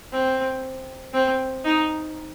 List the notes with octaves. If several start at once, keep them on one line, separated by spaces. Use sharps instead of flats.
C4
C4
D#4